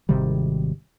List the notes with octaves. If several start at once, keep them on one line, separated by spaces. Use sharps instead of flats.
G#1 C3 D#3 G3